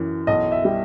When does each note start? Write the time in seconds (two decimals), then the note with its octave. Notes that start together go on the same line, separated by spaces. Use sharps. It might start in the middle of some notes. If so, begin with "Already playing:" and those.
Already playing: F#2 E3
0.27 B1 D#5
0.52 E5
0.65 G3